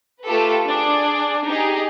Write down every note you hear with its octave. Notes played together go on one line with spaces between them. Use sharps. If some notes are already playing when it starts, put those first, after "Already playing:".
A3 F4 G4 A4 B4
D4 G#4
D#4 G4 G#4